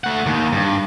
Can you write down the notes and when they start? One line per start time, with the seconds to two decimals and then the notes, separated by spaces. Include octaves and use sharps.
0.04 A3 F#5
0.26 D#2 D#3
0.53 G2